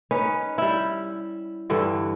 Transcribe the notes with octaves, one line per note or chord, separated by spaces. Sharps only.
C#4 D#4 B4
G3 E4
G2 D3 E3